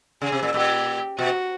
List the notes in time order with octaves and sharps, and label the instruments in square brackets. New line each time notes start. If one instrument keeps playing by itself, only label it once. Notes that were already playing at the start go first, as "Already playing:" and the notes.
[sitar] C#3 [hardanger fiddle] G#4
[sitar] C3
A#2
[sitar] A#2 [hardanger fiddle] G4
[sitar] B2 [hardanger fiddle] F#4